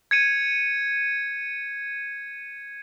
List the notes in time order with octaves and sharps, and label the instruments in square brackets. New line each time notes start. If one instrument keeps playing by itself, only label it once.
[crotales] G#6 C#7 D#7